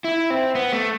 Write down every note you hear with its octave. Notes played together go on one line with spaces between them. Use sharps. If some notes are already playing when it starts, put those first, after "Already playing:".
E4
C4
B3
A3